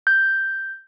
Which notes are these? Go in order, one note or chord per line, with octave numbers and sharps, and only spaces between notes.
G6